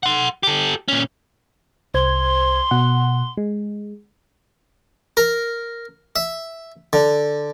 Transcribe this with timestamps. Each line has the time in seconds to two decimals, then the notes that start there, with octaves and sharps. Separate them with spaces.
0.03 F#5 C6
0.43 G4 A4
0.88 A#2 C#4
1.94 C2 C5 C6 G#6
2.71 B2 F#5
3.37 G#3
5.17 A#4
6.16 E5
6.93 D3